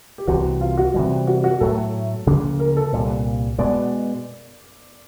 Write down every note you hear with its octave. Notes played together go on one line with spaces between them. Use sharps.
G4
C2 C3 E3 F#4
F4
F#4
C3 E3 G3
F#4
F#4
A2 F#3 A3 A4
D2 C#3 F3 A#3
A#4
A4
C2 A#2 G3
B2 G#3 B3 D5